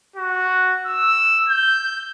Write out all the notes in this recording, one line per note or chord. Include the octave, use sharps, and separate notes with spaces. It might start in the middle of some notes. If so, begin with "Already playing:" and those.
F#4
E6
G6